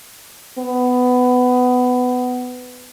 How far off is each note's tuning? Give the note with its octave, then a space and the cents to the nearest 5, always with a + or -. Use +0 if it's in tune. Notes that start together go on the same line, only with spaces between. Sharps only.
B3 +15